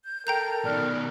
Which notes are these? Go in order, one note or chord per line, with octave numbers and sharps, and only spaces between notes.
G6
A4 A#4 G5 A#5 G6
B2 D#3 D5 F6 F#6